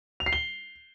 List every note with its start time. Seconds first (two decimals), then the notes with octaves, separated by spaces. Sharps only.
0.20 F7
0.26 C7
0.33 G7